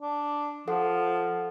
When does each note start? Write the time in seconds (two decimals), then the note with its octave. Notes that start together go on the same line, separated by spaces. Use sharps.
0.02 D4
0.68 F3 A4 F#5